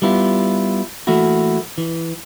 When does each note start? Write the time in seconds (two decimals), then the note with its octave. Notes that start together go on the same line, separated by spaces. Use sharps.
0.02 G3 B3 E4 F4
1.07 E3 A3 A#3 E4 F#4
1.78 E3